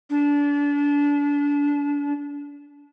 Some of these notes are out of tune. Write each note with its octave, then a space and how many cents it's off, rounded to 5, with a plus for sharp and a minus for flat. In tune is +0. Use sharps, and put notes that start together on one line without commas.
D4 -30